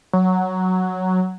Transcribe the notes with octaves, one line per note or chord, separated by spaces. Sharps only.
F#3